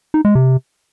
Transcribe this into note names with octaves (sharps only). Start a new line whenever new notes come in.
D#4
G#3
C3